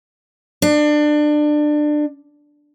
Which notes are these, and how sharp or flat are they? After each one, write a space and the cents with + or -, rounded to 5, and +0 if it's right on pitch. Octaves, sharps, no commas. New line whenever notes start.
D4 +25